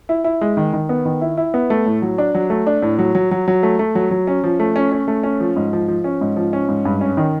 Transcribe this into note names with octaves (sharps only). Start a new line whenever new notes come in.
E4
E4
G#3
D#3
D#3
B3
D#3
E4
E4
B3
A3
A2
F#3
D4
F#3
A3
D4
A2
F#3
F#3
F#3
F#3
A3
A3
F#3
F#3
C#4
F3
A3
C#4
C#4
A3
C#4
F3
G#2
F3
F3
C#4
G#2
F3
C#4
G#2
G2
C#4
D#3